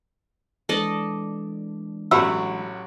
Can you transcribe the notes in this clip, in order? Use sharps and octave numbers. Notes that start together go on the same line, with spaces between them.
E3 G#3 D4 A4 D5 D#5
A1 F#3 F#4 G4 E5 B5 E6